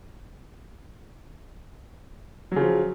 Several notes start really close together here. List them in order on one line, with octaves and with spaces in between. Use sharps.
F#3 C#3 F3